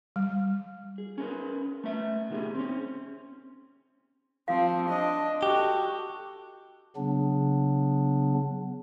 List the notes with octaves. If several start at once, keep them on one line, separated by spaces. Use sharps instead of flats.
G3
G#4
C#4 A#4 B4
A3 B4 E5
B2 D#3 F#3 A3 G4 G#4
C4 C#4
F3 C4 F5
D4 D#5
F#4 G4 A4
C#3 F#3 B3 D4